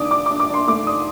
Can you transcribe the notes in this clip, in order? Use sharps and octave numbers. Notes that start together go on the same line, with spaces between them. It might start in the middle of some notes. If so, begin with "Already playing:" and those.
Already playing: D#3 D4 D6 D#6
D4 D6
D4 D6
D6
D4 C6
A3 D6
D4 D#6